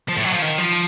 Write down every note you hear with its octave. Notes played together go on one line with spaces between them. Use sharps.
F3
A2
F#3
F3
D#3
F3